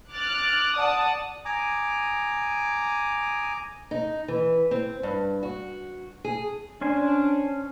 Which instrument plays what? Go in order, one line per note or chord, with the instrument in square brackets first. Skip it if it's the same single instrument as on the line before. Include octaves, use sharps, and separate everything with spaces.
[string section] D6 F6 F#6 A6
D5 F#5 A5 D#6
[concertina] G#5 A#5 D6 D#6
[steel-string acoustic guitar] D#4
E3
C4
G2
F#4
G#4
[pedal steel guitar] C#4 C5 G#5 [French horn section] D4